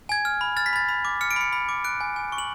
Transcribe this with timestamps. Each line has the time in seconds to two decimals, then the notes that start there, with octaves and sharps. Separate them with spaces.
0.09 G#5 G#6
0.25 F6
0.41 B5
0.57 F6 A6
0.66 B6
0.73 B5 A6
0.89 B5
1.05 D6
1.21 F6 C#7
1.31 D7
1.36 B5 C#7
1.53 B5
1.69 D6
1.84 F#6 D7
2.01 G#5
2.16 G#5
2.32 C#6
2.38 F#7